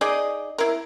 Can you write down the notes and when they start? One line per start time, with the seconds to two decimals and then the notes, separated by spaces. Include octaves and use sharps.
0.01 D#4 G#4 D5 D#5
0.58 E4 A#4